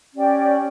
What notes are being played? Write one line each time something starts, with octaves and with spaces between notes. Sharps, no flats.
C#4 G4 D5 G5